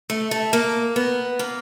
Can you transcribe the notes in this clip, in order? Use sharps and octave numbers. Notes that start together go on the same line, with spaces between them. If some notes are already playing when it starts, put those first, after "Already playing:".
A3
A3
A#3
B3
A#3